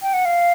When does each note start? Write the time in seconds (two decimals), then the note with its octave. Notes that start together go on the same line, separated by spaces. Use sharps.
0.02 G5
0.13 F#5
0.25 F5